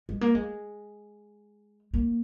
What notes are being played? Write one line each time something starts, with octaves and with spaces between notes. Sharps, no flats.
G#3
A#3
G#3
A#3